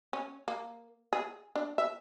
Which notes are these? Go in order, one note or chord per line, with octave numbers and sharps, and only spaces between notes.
C#4
A#3
G#4
D4
E5